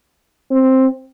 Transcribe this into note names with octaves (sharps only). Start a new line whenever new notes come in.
C4